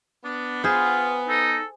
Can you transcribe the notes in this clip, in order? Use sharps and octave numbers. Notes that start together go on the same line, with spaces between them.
B3 D4
F4 G#4 C5
D#4 A4